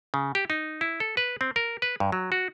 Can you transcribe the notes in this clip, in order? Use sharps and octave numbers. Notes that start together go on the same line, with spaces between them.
C#3
G4
D#4
E4
A4
B4
C4
A#4
B4
G2
F#3
F#4